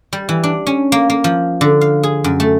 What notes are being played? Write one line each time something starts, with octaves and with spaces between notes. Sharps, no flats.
G3
E3
D4
C#4
A#3
A#3
F3
D3
F5
G#4
F#2
A3